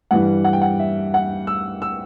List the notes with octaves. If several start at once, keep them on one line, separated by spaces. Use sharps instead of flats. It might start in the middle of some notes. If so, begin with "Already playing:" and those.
G2 E3 G3 F#5
F#5
G5
F#5
E5
F#5
E6
E6